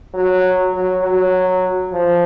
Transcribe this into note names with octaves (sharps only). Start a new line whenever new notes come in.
F#3
F#3
F#3
F3